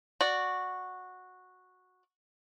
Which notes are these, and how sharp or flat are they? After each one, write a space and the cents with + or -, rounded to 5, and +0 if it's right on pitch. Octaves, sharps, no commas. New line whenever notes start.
F#4 -10 D5 +0